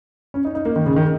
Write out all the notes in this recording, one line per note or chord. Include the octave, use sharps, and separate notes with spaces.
C#4
D#4
D#4
A#3
D#3
C#3
D#3